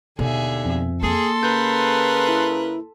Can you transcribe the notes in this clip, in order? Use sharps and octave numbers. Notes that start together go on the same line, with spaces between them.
D#2 B2 D3 G#4 E5
F2
A#3 G#4 A4 C6
C#3 A#4 B4 G6
E4